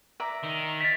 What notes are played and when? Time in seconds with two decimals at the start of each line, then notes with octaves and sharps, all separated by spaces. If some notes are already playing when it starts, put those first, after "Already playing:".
0.20 D5 E5 A#5
0.44 D#3 D#4
0.81 A6 B6